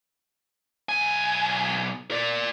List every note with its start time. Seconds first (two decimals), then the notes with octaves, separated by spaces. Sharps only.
0.89 B1 G#5
2.11 A#4 D5